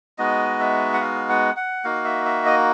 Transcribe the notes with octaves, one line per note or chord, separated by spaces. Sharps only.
G#3 B3 D#4 F#4 D#5
E5
F#5
F5
F#5
F#5
A#3 D#4 F#4 F5
E5
E5
D#5